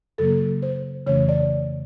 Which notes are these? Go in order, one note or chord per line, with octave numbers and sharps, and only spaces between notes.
F#2 C#3 F#3 A#3 A4
C5
F2 C#3 E3 A3 C#4 C#5
D5